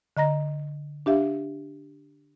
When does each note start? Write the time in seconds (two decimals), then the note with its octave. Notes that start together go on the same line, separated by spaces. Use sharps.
0.17 D3 D#5 A#5 A#6
1.06 D4 G4 E5 F5